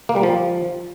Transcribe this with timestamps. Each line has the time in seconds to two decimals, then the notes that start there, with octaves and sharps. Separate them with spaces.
0.09 A#3
0.16 G3
0.23 F3